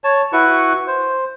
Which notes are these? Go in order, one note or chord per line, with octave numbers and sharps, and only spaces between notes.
C#5 A5
E4 F#4 B4 C#6
C5